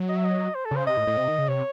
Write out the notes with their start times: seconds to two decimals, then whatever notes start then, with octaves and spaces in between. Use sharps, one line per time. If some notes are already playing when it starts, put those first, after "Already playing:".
Already playing: F#3
0.09 D#5
0.16 E5
0.25 D#5
0.55 C5
0.65 A4
0.71 C#3
0.76 C5
0.87 C3 D#5
0.97 A2
1.07 A2
1.17 C3
1.28 D#3
1.38 C#3
1.48 C3 C#5